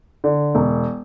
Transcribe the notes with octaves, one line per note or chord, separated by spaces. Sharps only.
D3
E1